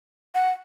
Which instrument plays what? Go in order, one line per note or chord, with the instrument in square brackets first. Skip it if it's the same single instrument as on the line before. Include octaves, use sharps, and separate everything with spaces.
[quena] F#5